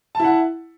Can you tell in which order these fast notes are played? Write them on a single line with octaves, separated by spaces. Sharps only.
A5 E4 F#5